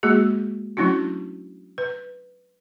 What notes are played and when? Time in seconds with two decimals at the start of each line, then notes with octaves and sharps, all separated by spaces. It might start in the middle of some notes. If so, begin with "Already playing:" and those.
0.03 G#3 A#3 F#4 G#4
0.77 F#3 A3 C#4 D4 E4 F#4
1.78 B4